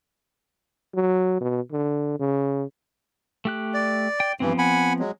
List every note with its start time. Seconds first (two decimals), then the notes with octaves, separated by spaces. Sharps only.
0.95 F#3
1.41 B2
1.72 D3
2.20 C#3
3.45 A3 G4 F#6
3.74 D5
4.20 G5
4.40 G2 E3 F3 B3 C4
4.58 F#5 G#5 B5
4.99 F#3 G#3